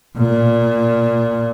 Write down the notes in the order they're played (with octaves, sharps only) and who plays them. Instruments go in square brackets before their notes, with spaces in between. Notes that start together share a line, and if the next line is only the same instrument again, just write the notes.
[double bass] A#2